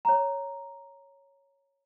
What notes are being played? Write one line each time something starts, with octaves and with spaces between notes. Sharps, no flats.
C#5 A#5